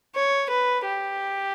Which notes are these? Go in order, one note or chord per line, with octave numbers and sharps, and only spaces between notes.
C#5
B4
G4